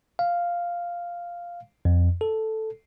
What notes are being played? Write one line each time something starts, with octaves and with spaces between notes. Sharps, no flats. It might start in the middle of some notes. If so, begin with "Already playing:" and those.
F5
F2
A4